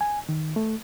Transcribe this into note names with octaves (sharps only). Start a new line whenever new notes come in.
G#5
D#3
A3